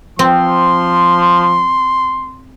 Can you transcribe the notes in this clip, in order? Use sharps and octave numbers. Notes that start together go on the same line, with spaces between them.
F3 C4 C6